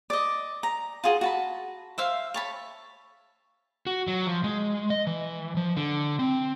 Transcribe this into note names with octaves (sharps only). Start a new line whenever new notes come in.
D5 D#5
A#5
F4 F#4 G#4 D#5
F#4 A5 B5
C5 E5 F5
C#5 A5 B5
F#4
F#3
F3
G#3
D#5
E3
F3
D3
C4